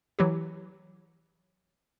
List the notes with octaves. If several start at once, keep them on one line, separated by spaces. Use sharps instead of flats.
E3 F#3 E4 G4